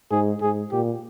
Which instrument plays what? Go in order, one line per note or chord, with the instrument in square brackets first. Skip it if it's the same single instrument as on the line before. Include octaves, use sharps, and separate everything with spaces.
[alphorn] G#2 [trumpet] G#4
[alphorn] G#2 [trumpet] G#4
[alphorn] A#2 [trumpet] G4